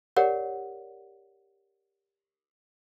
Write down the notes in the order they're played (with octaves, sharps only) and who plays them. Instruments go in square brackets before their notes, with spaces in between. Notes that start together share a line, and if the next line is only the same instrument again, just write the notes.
[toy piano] G4 A#4 C#5 D5 F#5